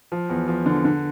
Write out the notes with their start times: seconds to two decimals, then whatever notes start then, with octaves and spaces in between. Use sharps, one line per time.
0.12 F3
0.30 E2
0.48 F3
0.66 D3
0.85 D3